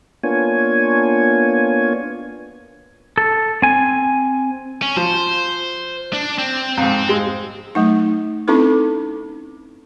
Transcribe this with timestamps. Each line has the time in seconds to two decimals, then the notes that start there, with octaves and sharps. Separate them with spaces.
0.23 A#3 B3 D4 F4 C#5 G#5
3.18 A4
3.62 C4 G#5
4.82 C#4
4.96 F3 C5
6.13 D4
6.38 C4
6.77 F2 G#2
7.09 G#3
7.75 F#3 A3 D#4
8.48 C4 C#4 D#4 E4 A4 B4